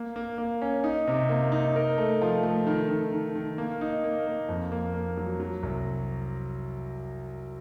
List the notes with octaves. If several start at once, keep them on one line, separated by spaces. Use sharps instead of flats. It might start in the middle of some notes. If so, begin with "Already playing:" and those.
Already playing: A#3
A#3
A#3
C#4
D#4
C3
A#3
D#4
A#4
A3
F3
A3
D#3
D#3
D#3
D#3
A#3
D#4
A#3
A#3
F2
A#3
A#3
F#3
F#3
C2